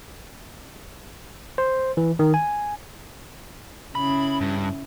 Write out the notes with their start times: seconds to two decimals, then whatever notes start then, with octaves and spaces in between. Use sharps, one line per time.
1.58 C5
1.97 E3
2.19 D#3
2.34 G#5
3.95 C#3 E4 B5
4.41 G2